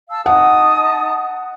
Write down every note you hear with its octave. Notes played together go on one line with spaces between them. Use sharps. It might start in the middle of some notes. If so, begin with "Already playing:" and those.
F5 A5 E6
D#4 F#5 A5 D#6